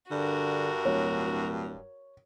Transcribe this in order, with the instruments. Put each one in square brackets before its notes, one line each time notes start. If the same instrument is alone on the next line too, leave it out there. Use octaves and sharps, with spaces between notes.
[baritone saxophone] G2 [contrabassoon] D3 [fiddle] F#4 A#4
[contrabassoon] D1 [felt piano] C#5